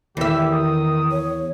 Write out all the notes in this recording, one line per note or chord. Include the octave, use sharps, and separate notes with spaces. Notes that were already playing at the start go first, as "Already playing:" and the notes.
E2 D#3 G4 E5
D#6
C#5